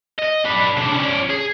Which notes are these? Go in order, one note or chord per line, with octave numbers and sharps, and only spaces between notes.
D#5
D4 B4
C#3 D4
C#4 D5
G#4